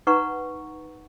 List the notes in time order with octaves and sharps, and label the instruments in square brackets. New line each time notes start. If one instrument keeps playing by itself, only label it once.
[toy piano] D#4 B4 F#5 A#5 C#6